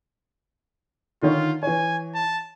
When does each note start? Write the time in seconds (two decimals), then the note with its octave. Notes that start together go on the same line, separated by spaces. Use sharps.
1.22 D3 D#3 F4 C#5
1.63 E3 C#5 G#5
2.15 A5